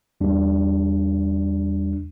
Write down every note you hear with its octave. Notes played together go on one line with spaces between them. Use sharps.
E2 G3 D4